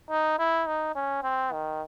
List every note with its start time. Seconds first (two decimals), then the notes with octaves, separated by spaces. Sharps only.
0.10 D#4
0.39 E4
0.67 D#4
0.95 C#4
1.23 C4
1.52 D#3